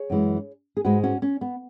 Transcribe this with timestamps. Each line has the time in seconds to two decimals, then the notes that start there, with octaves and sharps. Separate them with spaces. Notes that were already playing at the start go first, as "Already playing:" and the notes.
Already playing: G#4 C#5
0.10 F#2 E3 G#3
0.77 G#4
0.85 G#2 G#3 F#4 B4
1.04 C#4 F#4
1.22 C#4
1.41 B3